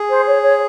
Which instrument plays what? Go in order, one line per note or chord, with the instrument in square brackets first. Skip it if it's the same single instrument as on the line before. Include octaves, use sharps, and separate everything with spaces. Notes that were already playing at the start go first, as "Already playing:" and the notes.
Already playing: [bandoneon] G#4
[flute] C5
C#5
C#5